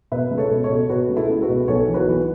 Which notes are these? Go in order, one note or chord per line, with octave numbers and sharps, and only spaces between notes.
B2 B4 E5
C#2
A4 C#5
B2
A4 C#5
B2
B2 F#4 B4
C#2
E4 A4
C#2
F#4 B4
B2
B1 A4 C#5
E3
F#4 B4
B1